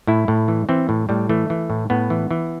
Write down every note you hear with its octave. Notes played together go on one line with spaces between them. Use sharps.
A2 E4
A2
E3
E3 C4
A2
A2 G3
E3 A3
E3
A2
A2 B3
E3
E3